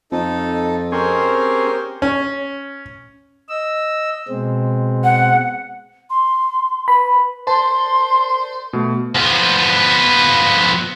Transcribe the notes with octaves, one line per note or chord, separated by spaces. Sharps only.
F2 D#4 A4
C4 C#4 G4 G#4 A#4 C5
C#4
D#5 E6
B2 G#3 C4
F#5
C6
B4 B5
C5 A5 C6
B2 A3
F3 B3